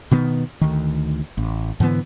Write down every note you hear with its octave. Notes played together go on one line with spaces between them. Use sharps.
B2 D#3 B3
D2 D#3
A1
G#2 D3 E3 B3